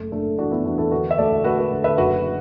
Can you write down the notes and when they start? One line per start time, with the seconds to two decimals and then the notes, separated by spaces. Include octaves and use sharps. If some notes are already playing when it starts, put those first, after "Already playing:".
Already playing: F#1 A3
0.12 F#1 A3 D4
0.38 E3 D4 F#4
0.52 B3 E4
0.65 E2 D4 F#4
0.78 E4 A4
0.91 D3 F#4 B4
1.11 E5
1.18 D2 A4 D5
1.44 D2 F#4 B4
1.59 F#4 B4
1.72 D3
1.84 B4 E5
1.98 F#1 F#4 B4